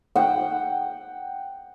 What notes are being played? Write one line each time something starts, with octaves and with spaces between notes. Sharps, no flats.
F#5 G5